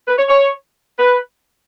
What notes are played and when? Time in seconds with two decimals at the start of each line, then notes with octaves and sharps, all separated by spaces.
0.08 B4
0.18 C#5
0.29 C#5
0.99 B4